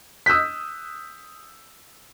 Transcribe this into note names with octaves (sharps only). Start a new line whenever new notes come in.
D#6 E6 F#6 G6 B6